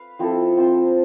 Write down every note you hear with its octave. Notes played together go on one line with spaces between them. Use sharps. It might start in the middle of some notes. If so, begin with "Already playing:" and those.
Already playing: B4 F5
F3 C4 E4 A4
C4 F4 C5